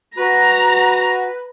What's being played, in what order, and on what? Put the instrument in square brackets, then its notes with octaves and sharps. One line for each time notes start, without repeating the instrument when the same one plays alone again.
[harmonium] F#4 [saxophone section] B4 [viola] A#5